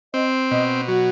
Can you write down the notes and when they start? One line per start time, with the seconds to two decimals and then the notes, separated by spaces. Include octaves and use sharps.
0.14 C4 D#5
0.51 B2 D#5
0.88 F#3 F#4